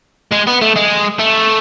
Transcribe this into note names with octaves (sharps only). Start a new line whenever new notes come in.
G#3
B3
A3
G#3
A3